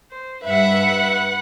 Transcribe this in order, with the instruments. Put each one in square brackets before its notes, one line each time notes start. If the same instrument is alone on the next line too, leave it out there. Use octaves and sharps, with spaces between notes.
[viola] C5
[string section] G2 E5 [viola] B4 F#5